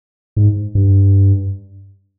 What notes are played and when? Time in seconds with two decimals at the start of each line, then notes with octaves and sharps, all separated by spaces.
0.37 G#2
0.75 G2